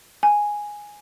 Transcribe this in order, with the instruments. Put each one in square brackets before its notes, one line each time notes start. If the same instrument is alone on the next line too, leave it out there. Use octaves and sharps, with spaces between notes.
[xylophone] G#5